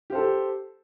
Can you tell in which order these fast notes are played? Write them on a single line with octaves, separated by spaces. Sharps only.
G4 C5 A4